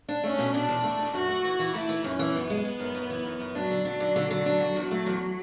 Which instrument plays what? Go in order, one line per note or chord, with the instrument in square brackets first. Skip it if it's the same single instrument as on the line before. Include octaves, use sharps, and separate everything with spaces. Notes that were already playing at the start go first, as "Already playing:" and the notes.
[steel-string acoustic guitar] D4
[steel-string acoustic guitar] A3 [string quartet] C#4
[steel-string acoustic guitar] B2
[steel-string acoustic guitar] B2 [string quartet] D4
[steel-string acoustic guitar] E2
A3
B2
[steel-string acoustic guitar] F#2 [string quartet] F#4
[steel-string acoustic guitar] A3
E3
E3
[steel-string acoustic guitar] A3 [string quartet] E4
[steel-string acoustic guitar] E3
[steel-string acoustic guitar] F#2 [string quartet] C#4
[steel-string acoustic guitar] E3
[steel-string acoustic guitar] F#2 [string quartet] B3
[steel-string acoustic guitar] G#3
G#3
F#2
F#2
E3
F#2
F#2
[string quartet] F#3 [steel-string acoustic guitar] D4
[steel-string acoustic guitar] D3
[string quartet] F#3 [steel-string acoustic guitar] D4
[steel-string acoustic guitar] D3
D3
D3
D4
F#4
[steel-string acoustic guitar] E2 [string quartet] F#3
[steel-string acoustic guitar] A3
E2